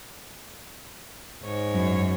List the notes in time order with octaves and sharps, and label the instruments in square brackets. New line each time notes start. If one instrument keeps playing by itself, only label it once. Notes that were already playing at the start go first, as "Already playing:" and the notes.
[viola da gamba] G#2 C#5
[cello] F#2